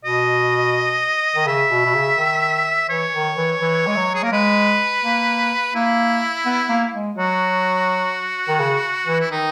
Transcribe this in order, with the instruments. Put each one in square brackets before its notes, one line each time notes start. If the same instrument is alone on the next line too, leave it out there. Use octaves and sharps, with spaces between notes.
[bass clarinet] B2 [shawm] D#5
[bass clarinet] D#3
[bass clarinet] C#3 [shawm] E5
[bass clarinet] B2
B2
C#3
D#3
[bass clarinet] E3 [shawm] C#5
[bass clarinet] D#3
E3
E3
G#3
F#3
[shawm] G#4
[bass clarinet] A#3 [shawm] A#4
[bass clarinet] G#3 [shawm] B4
[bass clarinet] A#3
[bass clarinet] A#3 [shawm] E4
[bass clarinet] B3
A#3
G#3
[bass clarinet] F#3 [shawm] F#4
[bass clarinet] D#3
C#3
E3
[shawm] E4
[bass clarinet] D#3 [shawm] D#4